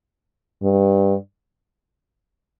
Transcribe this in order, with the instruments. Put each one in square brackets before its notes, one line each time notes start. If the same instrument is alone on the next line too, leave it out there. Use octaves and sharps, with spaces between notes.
[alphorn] G2